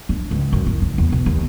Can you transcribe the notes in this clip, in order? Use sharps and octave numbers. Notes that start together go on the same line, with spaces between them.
D4
C#2
F#2
E4
C#2
E2
B2
D#2